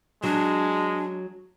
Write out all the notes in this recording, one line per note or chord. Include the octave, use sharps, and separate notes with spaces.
F#3 G#3 D4